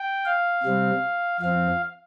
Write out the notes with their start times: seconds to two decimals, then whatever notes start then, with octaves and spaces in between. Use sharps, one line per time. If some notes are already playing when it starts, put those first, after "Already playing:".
Already playing: G5
0.25 F5
0.63 C3 G3 C4
1.40 F2 F3 C4 F5